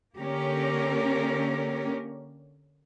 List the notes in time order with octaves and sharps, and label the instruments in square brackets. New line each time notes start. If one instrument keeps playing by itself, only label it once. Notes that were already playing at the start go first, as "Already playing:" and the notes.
[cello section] D3 A#3 C#4 G4 A#4